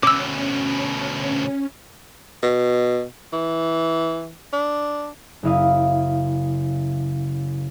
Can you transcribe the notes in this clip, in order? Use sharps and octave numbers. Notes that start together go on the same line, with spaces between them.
D2 B2 C#4 D6 E6
B2
E3
D4
F#1 C#3 E4 F5 D#6